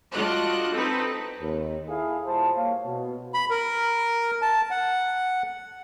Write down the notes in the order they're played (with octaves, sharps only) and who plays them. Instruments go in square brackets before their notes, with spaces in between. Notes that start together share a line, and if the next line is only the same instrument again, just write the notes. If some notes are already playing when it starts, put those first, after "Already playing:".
[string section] G3 D4 F4 F#4 D#5 F#6
C4 D#4 A4 B4
[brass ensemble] D#2
E4 G#4 A4 F5
A#2 G3 E4 C5 A5
A#3 C#5 F5
B2
[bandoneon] B5
A#4
A5
F#5